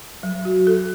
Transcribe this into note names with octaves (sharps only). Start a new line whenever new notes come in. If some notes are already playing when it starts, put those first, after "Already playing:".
F#3
F#4
A4